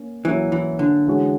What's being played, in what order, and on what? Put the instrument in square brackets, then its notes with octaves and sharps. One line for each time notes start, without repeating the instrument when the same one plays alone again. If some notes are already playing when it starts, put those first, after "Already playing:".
Already playing: [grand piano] A#3 C#4
[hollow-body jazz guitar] E3 [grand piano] F#3 A#3 C#4 E4
[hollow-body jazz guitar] E3
D3
[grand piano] E3 G#3 C#4 F#4